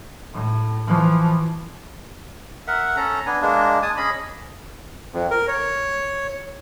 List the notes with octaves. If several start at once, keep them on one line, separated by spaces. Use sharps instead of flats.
A2
E3 F3
A#4 E5 F#5
C#4 A4 A#5
B3 D4 G#5
G#3 A#3 D4
G#5 A5 D#6
C#4 G#4 D#5 B5
F2
A#4
C#5